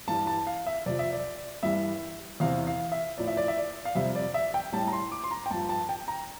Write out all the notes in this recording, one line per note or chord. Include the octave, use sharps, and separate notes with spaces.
G2 E3 G3 A5
A5
F5
E5
F2 C3 F3 D5
E5
D5
G2 E3 G3 E5
E2 C3 E3 F5
F5
E5
A2 F3 D5
E5
D5
E5
D5
F5
F2 C3 G3 E5
D5
E5
G5
A2 G3 A5
A#5
C6
D6
C6
A#5
G5
G2 F3 A5
A5
G5
A#5